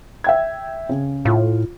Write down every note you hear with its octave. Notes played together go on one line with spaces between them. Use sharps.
E5 G5 G#6
C#3
A2 F4